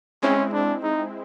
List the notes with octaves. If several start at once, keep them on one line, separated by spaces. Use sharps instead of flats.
G#3 C4 C#4 E4
D4
D#4